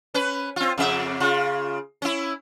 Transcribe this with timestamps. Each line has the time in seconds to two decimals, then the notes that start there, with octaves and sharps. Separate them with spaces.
0.14 C#4 B4
0.56 C4 F4
0.78 F2 C#3 E5
1.20 C#3 F4
2.02 C#4 E4